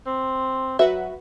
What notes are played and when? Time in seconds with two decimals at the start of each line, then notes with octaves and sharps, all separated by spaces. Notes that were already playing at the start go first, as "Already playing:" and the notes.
0.06 C4
0.79 F#3 F#4 B4 E5